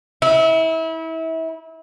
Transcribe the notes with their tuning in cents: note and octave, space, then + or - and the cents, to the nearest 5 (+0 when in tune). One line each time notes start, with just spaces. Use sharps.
E4 -30